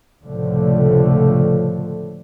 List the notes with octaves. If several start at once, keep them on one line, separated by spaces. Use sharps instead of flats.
F1 C#2 A2 D3 F3 A3